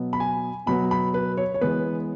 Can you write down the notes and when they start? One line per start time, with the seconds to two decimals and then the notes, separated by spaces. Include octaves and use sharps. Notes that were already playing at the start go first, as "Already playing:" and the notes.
Already playing: B2 F#3 B3
0.13 B5
0.20 G#5
0.66 B2 F#3 B3 B5
0.91 B5
1.14 B4
1.38 C#5
1.54 C#5
1.61 E3 G#3 B3 B4